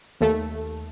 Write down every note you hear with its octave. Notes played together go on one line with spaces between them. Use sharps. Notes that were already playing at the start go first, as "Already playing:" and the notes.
D#2 A3